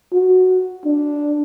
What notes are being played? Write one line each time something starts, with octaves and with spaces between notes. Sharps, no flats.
F#4
D4